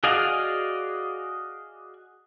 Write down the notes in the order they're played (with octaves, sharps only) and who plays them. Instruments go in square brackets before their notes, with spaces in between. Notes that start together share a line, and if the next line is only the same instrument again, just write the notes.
[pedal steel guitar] F#4 G#4 D5 D#5 F5